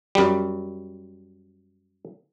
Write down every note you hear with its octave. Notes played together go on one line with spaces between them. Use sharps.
F#2 G3